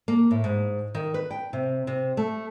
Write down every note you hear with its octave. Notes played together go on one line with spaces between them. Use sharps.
A#3
A2
G#2
D#3
B4
G5
C3
C3
A3